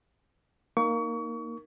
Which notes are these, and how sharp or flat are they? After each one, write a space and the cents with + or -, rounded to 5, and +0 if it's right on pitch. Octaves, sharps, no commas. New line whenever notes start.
A#3 +0 D#4 +0 C#6 +30